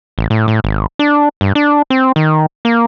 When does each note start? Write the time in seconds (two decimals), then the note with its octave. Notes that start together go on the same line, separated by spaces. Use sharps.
0.18 A1
0.30 A2
0.48 A2
0.64 G#1
0.99 D4
1.41 G2
1.55 D4
1.90 C4
2.16 D#3
2.65 A#3